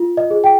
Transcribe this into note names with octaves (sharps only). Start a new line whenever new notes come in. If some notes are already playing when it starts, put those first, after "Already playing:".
Already playing: F4
D#5
G#4
G5